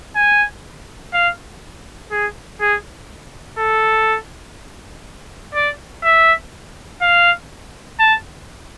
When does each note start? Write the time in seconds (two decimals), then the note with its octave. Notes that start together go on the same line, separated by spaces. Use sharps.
0.16 G#5
1.14 F5
2.12 G#4
2.61 G#4
3.59 A4
5.55 D5
6.04 E5
7.02 F5
8.00 A5